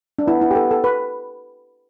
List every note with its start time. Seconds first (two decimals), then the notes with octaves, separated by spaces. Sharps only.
0.19 D4
0.28 B3 E4
0.41 E4
0.51 G4
0.55 A4
0.71 A4
0.84 B4